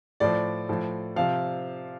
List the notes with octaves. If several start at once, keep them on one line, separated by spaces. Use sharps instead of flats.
A2 F3 D5
A2 F3
C3 F3 F5